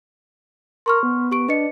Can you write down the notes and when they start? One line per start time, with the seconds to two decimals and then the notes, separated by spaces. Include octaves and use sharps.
0.86 A#4 C6 C#6 F6
1.03 B3
1.31 G4 C#6 D7
1.49 D4 B4 D#5 C#7